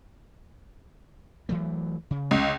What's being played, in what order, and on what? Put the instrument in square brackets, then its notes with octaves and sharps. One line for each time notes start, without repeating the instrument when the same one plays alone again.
[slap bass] E3 F#3 A3
C#3
[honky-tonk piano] C#2